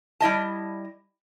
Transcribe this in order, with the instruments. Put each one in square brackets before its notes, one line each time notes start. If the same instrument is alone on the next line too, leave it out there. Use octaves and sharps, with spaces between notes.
[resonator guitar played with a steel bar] G3 E4 D#5 A5